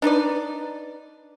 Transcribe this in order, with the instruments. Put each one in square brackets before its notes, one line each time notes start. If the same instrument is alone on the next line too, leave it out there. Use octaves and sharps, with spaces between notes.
[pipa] D4 D#4 B4 D5